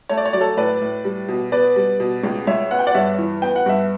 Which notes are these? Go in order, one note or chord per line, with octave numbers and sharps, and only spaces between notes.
A3 C#5
D5
C#5
F#3 D5
A4 C#5
A2 B4 D5
A2
G3
B2
B3 B4 D5
G3
B2
C#2
C#2 C#5 E5
B3 F#5
G5
D5 F#5
G2 C#5 E5
E3
B3 G5
F#5
G2 E5